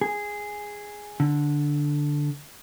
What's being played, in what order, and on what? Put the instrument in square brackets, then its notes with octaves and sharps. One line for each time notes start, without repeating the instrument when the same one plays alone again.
[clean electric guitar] G#4
D3